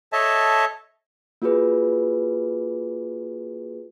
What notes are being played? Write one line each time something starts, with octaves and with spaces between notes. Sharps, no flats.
A4 C#5 D#5 E5 A5
A#3 F4 F#4 G#4 B4